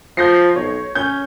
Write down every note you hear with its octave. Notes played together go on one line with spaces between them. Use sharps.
F3 G6 A#6 C7
B1 C#5
C#4 G6